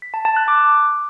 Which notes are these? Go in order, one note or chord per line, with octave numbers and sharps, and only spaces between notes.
B6
A5
A5
F#6
D6